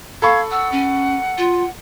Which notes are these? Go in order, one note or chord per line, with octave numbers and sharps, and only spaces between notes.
A4 F5 B5 C#6 G#6
F#5 E6
C#4
F4